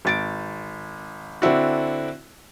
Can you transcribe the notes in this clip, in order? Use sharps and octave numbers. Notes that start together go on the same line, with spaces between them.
G#1 A6 D7
D3 C4 D4 E4 F#4